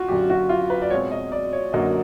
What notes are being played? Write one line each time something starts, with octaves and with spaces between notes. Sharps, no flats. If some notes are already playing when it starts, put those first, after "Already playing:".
Already playing: F4 F#4
F#2 D3 F#3 G4
F#4
F4
B4
D5
B2 G#3 C4 F4 C#5
D#5
D5
C#5
F#2 D3 F#3 A#3 D#5